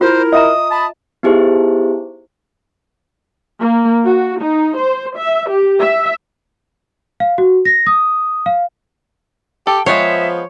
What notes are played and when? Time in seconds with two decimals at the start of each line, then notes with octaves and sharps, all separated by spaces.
0.01 E4 F4 A#4 C5
0.33 D#5 E5 A#5 D#6
0.71 A5 B5
1.23 B3 D#4 E4 G4 G#4 C5
3.60 A#3
4.04 F#4
4.41 D#4
4.76 C5
5.18 E5
5.49 G4
5.80 E5
7.20 F5
7.38 F#4
7.65 A#6
7.87 D#6
8.46 F5
9.67 G4 A4 G5
9.86 F3 G#3 B3 C5 C#5 E5